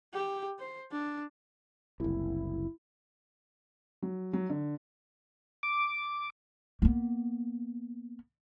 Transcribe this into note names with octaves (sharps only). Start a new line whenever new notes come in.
G4
C5
D4
F#1 C2 E4
F#3
F#3
D3
D6
A#3 B3